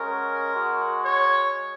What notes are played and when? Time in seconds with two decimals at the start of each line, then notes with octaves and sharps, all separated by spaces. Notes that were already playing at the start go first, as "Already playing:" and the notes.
Already playing: G#3 C#4 F#4 A#4
0.54 G#3 F#4
1.04 C#5